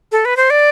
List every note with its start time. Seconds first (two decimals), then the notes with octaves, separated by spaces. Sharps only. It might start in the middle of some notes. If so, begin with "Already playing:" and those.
0.12 A4
0.25 B4
0.37 C5
0.50 D5